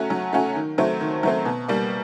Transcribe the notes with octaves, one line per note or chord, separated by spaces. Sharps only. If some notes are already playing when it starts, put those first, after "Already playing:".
Already playing: F#3 A3 C#4 F#4
F#3
A3 C#4 F#4
D#3
F#3 A3 C4
D#3
F#3 A3 C4
B2
G3 A#3